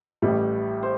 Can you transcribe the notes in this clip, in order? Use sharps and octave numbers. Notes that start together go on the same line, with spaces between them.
A1 A2 G3
C5